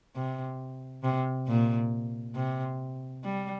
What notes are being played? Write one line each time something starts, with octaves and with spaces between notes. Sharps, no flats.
C3
C3
A#2
C3
G3